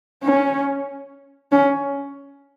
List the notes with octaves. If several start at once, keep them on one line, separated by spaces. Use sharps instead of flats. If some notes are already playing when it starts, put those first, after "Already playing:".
C#4
C#4